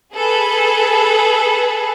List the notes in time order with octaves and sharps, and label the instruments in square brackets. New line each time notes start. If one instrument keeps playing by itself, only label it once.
[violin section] G#4 A4 B4